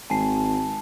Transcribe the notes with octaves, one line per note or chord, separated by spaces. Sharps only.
G#1 G#5 A5 C7